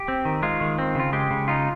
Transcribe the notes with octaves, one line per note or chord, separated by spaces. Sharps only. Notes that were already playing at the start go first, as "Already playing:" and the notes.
Already playing: G4
C4
D#3
G#3 F4
D#3
C4
C#3 F4
G#3 G4
C#3
D#4 F4